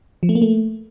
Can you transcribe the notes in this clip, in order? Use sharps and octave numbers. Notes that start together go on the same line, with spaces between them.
F3
A3
A#3
A3